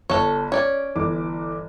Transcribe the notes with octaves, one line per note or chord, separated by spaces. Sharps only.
G1 A4 C#5
C#4 C#5 D5
G1 E3 D6